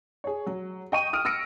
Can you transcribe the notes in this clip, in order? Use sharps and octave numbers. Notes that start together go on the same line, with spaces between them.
G#4 C#5
F#3
D#5 G5 C#6 D#7
D#6 F6 D7
E6 F6 A#6 C#7 D7